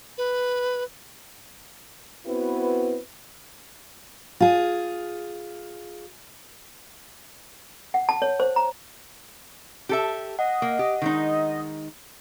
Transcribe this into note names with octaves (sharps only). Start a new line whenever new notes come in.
B4
B3 C4 E4 F#4 B4
F4 G#4
F#5
A5
C#5
C5
A#5
G4 A4 E5
D#5 F#5
A#3
G4
D#3 G#3 D#4